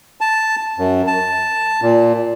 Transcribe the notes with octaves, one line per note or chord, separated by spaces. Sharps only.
A5
F#2
A5
A#2